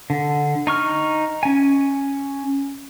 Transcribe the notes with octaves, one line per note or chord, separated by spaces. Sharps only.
D3
D#4 C#6 F6
C#4 G#5